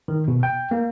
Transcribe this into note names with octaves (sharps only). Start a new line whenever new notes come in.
D#3
B2
G5
A#3